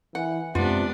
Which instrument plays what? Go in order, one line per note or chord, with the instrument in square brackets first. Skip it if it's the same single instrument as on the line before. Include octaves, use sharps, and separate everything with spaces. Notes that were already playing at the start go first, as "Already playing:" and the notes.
[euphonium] E3 [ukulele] F#5
[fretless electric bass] F#2 G#3 [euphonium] C3 [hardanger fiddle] B3 D4 [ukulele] F4